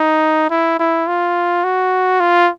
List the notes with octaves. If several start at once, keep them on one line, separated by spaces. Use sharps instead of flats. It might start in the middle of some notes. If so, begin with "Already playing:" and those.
Already playing: D#4
E4
E4
F4
F#4
F4